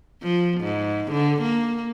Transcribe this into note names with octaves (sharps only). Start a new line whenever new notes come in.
F3
G#2
D3
A#3